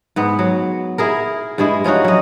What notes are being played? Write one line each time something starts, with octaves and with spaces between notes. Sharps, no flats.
G#2 B3
F#3
E4 G#4 A#4
G2 G#3 E4 G#4
F3 C#4 D#4 F#4
F#3 D#5